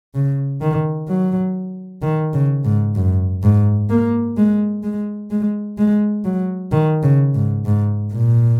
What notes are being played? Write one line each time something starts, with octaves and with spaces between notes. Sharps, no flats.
C#3
D#3
F#3
D#3
C#3
G#2
F#2
G#2
A#3
G#3
G#3
G#3
G#3
F#3
D#3
C#3
G#2
G#2
A#2